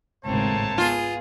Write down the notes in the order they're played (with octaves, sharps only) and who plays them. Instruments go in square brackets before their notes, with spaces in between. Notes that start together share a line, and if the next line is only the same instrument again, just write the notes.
[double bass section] G#1 C#2 A2 [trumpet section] A3 C#5 A5 [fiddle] A#3 C4
[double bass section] B3 [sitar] F4 [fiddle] G#4